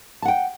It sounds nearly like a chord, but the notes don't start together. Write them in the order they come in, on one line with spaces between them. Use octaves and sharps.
A5 F#5 G5